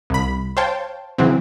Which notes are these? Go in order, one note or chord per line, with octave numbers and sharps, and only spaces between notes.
C2 B5
C5 C#5 F5 G5 A5
C#3 E3 F#3 C4